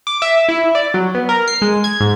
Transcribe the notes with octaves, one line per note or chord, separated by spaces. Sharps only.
D6
E5
E4
D5
F#3
B3
A#4
C7
G#3
G#6
G#2